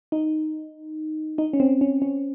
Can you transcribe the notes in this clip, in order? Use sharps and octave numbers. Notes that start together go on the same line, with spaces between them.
D#4
D#4
C#4
C4
C#4
C#4